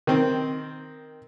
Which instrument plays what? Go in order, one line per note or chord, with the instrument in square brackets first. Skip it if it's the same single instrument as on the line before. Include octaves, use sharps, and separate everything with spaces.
[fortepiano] D#3 C4